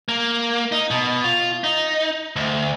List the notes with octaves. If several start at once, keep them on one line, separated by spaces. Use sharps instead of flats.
A#3
D#4
B2
F4
D#4
D2